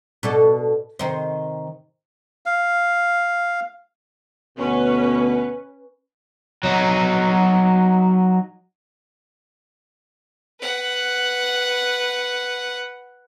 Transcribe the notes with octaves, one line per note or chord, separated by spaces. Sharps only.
B2 D4 A4
C3 D#3 C5
F5
D2 B2 C#4 B4
F#3 D#4
B4 F#5